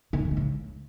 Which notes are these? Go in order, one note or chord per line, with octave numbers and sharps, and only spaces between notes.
B2
C#3
D3
G#3
C#3